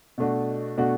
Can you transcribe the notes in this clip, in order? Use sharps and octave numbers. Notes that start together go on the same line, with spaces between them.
B2 A3 D4 F#4
B2 A3 D4 F#4